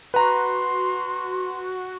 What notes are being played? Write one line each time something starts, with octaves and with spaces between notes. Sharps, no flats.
F#4 B4 A#5 C6